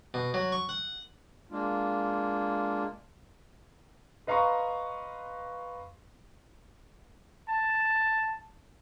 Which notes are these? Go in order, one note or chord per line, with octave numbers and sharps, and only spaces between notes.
B2
F#3
C#6
F#5
G#3 A#3 D4 F4
B4 D#5 F5 A#5 C6 C#6
A5